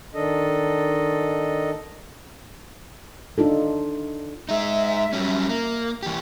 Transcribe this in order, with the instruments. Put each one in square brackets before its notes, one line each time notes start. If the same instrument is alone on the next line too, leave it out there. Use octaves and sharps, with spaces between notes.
[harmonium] D#3 D4 A4 D#5
[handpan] D4 D#4 F4 A4
[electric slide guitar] G#3 D#4 [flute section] E5
[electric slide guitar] F#3 G3 C#4
A#3
E3 G4